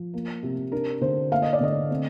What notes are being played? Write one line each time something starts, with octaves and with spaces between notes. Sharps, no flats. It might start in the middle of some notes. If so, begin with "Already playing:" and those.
Already playing: F3
A#3
C3
D4 A#4
D3 C5
A#3 F5
D#5
D5
D3 D#5
C4